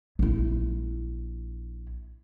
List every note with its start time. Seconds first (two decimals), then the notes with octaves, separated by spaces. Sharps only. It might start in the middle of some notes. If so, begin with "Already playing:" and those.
0.19 A#1 E4